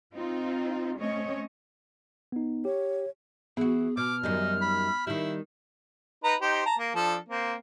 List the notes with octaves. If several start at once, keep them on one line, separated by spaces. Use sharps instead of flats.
C4 D#4 F4
A3 C4 C#4 C#5 D#5
B3 D#4
G4 C#5
E3 B3 F#4 G#4
B2 D6 F6
F#2 D#3 G3 D#4
B5
D#3 G3 E4
D#4 B4 A#5
D#4 G4 C5
A5 A#5
A#3
F3 D4 A4
A#3 C4